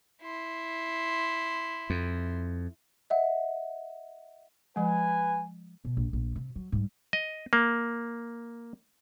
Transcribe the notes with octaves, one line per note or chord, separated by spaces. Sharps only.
E4 C6
F2
D#5 E5 F#5
F3 G#3 B4 G#5
B2
A#1
A#1
C3
F#3
G#2 G3
D#5
A#3